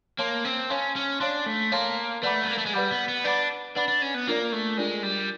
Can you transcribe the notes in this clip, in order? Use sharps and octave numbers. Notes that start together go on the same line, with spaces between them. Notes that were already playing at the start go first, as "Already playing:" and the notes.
A#3 C#5 F5 A5 C6
C4
C#4 C#5 F5 A5 C6
C#4
D4 C#5 F5 A5 C6
A3
A#3 C#5 F5 A5 C6
A3 B4 D5 F#5 B5 D6
B3
A#3
A3
G#3
G3 B4 D5 F#5 B5 D6
B3
B3
D4 B4 D5 F#5 B5 D6
D4 B4 D5 F#5 B5 D6
D4
C#4
B3
A#3 D4 F4 A#4 D5
A3
G#3 D4 F4 A#4 D5
G3